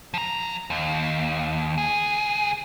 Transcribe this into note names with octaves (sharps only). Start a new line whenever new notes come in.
F3 A#5
D#2
C#2 G#4